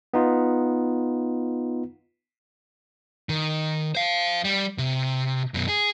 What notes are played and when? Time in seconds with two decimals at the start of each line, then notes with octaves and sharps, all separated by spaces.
0.14 B3 D#4 F4
3.29 D#3
3.95 C5 F5
4.44 G3
4.78 C3
5.54 F#2 B2
5.69 G#4